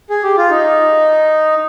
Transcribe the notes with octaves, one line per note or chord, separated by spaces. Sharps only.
G#4
G4
F4
D#4